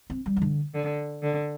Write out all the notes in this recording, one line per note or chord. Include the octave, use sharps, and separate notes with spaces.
C4
G3
E3
D3
D3
D3